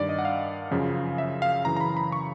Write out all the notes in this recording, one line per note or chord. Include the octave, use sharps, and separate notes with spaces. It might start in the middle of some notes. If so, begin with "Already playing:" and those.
Already playing: G2 D#3 D5
D#5
F#5
F5
F#2 C#3 F3
E5
F5
F#2 C#3 E3 A#5
A#5
B5
B5
C#6